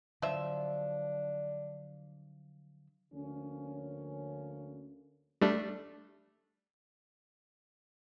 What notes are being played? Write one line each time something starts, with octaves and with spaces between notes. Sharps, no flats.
D3 F3 F#3 D4 E5
D2 D3 F3 A#3 C#4
G3 A3 D4